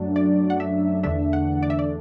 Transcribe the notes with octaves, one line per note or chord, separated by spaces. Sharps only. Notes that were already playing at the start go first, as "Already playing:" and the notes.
Already playing: F#2 F#3 A3 D4
D5
F#5
E5
E2 D3 A3 D4 E5
F#5
D5
E5
D5